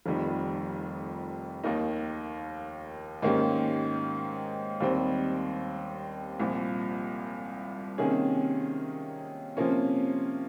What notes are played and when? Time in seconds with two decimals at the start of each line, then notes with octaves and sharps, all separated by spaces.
0.06 F1 F2 D#3 G3
1.64 D#2 D#3 A#3 D#4
3.22 G#2 D#3 A#3 C#4 G4
4.80 D#2 D#3 G3 C4
6.40 C2 A#2 F3
7.98 C3 D#3 A#3 C#4 G#4
9.57 C3 F3 A#3 C#4